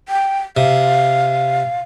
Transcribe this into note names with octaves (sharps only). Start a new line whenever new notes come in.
G5
C3 F5